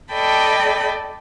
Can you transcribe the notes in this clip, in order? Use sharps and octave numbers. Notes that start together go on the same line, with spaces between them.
A4 D5 D#5 G5 A5 B5